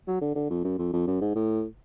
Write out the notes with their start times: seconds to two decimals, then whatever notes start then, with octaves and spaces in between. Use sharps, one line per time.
0.07 F#3
0.22 D3
0.35 D3
0.50 F2
0.64 F#2
0.79 F2
0.93 F2
1.07 F#2
1.21 G#2
1.35 A2